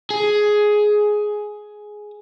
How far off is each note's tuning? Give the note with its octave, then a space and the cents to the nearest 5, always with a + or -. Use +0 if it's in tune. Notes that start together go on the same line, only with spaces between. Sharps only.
G#4 +10